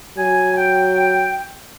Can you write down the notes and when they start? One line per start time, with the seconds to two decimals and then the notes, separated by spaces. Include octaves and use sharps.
0.17 F#3 G#5
0.57 G5